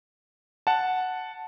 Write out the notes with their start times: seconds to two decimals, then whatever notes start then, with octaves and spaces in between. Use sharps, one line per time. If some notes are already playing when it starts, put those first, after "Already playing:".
0.67 F#5 A5